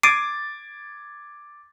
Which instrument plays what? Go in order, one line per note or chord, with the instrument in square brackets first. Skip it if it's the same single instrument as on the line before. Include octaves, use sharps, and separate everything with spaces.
[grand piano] D6 G#6 A6 [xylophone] C7 D7 D#7